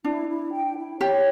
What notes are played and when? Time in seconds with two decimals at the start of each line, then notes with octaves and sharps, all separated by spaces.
0.04 D4 E4
0.29 E4
0.52 G5
0.76 E4
1.00 G4 C#5